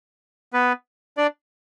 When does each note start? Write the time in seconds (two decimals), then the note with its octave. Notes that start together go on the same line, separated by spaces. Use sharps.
0.53 B3 B4
1.17 D4 D5